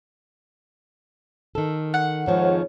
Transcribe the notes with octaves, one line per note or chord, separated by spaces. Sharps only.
D#3 A4
F#5
F2 G#2 D#3 F3 C#5